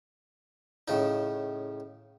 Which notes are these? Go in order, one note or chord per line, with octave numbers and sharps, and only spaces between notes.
A2 C#3 D#4